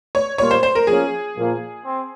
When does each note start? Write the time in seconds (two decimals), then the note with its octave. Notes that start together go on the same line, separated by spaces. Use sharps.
0.15 C#5
0.38 A#2 G3 A#3 F4 C#5
0.51 C5
0.63 C5
0.75 A#4
0.87 F3 A#3 C#4 G#4
1.36 A#2 F3 A#3
1.84 C4